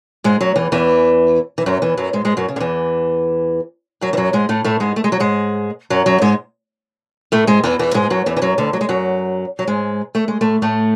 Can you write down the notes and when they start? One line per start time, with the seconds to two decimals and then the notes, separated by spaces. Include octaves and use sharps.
0.24 G#2 G#3
0.40 F#2 F#3
0.56 E2 E3
0.72 E2 E3
1.58 E3
1.66 F#2 F#3
1.82 E2 E3
1.97 F#2 F#3
2.13 G#2 G#3
2.25 G#2 G#3
2.37 F#2 F#3
2.48 C#3
2.56 D3
2.60 E2 E3
4.01 F#2 F#3
4.13 E3
4.17 F#2 F#3
4.33 G#2 G#3
4.49 A2 A3
4.64 A2 A3
4.80 G#2 G#3
4.96 A3
5.04 G#3
5.12 F#3
5.20 G#2 G#3
5.90 F#2 F#3
6.06 F#2 F#3
6.22 G#2 G#3
7.32 A2 A3
7.47 G#2 G#3
7.64 E2 E3
7.79 E2 E3
7.94 G#2 G#3
8.10 F#2 F#3
8.26 E2 E3
8.37 E3
8.42 F#2 F#3
8.58 D2 D3
8.73 F#3
8.81 G#3
8.89 F#2 F#3
9.59 F#3
9.67 G#2 G#3
10.15 A3
10.28 G#3
10.41 A2 A3
10.62 A2 A3